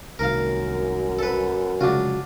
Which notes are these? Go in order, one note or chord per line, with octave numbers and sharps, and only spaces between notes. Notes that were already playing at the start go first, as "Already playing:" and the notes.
C2 F#2 D#3 A3 A#4 F5
A4 B4
F1 C#3 F#3 G#3 D4 F4 F#4